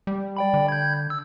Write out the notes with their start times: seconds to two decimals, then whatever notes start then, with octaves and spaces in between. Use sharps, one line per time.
0.07 G3
0.37 D5 G5 B5
0.54 D3
0.69 G6 G#6
1.10 E6